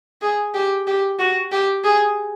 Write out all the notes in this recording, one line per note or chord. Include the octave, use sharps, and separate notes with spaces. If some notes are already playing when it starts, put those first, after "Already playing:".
G#4
G4
G4
F#4
G4
G#4